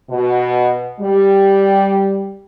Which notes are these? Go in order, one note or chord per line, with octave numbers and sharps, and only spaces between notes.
B2
G3